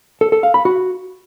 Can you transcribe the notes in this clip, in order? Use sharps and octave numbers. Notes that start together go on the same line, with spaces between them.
A4
A4
F5
B5
F#4